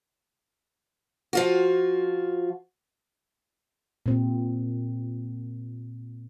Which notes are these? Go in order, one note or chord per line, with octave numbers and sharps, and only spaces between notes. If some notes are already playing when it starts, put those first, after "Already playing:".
F3 F4 F#4
A#2 C4